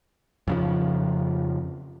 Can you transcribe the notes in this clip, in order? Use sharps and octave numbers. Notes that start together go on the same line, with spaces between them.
F2 C#3 F3